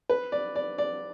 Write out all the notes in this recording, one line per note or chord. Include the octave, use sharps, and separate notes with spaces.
B4
D5
D5
D5